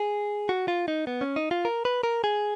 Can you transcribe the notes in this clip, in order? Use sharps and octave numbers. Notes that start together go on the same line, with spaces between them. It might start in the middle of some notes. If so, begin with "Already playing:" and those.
Already playing: G#4
F#4
F4
D#4
B3
C#4
D#4
F4
A#4
B4
A#4
G#4